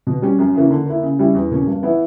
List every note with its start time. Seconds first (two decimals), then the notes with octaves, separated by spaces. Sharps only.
0.07 B2
0.22 G3 C#4
0.39 F#2
0.55 C#3 E3 A#3 C#4
0.71 D3
0.86 A#3 E4
1.03 C#3
1.19 G3 C#4 E4
1.34 E2
1.51 B2 A#3 C#4
1.67 G2
1.83 E3 B3 E4